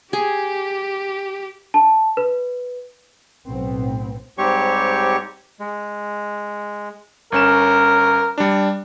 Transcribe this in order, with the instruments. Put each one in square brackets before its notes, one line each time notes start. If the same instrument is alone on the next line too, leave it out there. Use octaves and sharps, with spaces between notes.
[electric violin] G4 [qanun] G#4
[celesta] A5
B4
[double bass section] B1 A2 B3 C4
[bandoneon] G#2 G3 C4 G4 C#5 C#6
G#3
[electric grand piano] G1 C#4 E7 [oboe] A#4
[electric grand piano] G3 D4